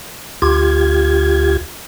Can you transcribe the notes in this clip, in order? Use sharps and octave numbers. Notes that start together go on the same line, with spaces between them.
D2 F4 G4 G#6